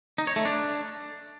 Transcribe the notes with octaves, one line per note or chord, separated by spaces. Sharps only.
D#4
C#5
A3
D4